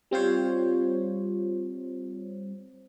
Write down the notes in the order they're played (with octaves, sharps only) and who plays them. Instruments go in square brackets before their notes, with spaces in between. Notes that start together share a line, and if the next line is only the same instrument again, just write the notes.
[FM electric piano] G3 C4 F4 C5 C#5